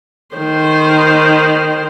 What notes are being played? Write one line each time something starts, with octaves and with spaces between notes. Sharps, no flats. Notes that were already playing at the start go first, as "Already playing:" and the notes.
D#3 C5